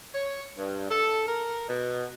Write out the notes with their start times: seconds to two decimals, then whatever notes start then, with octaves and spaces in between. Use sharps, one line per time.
0.14 C#5
0.56 G2
0.90 A4
1.27 A#4
1.69 B2